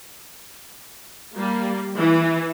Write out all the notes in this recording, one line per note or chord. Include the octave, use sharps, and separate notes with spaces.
G3 A#3
E3